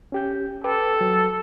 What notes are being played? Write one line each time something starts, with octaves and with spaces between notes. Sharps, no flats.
C#4 G4 G6
A4 B4 G5 D6
F#3